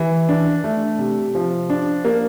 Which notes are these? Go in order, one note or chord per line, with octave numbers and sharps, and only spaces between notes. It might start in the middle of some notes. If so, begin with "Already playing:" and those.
Already playing: E3
D4
A3
C3
F3
D4
A#3